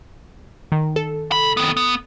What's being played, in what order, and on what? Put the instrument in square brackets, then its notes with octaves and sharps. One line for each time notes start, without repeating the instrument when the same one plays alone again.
[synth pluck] D#3
A4
[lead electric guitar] C3 B5
D#3 B3
B3